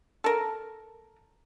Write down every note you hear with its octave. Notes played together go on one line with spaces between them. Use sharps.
A4 A#4